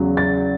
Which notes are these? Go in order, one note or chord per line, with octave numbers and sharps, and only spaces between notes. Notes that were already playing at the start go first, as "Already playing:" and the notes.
Already playing: E2 C#3 F#3
A6